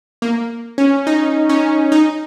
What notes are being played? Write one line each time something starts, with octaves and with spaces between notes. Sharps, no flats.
A#3
C#4
D#4
C#4
D#4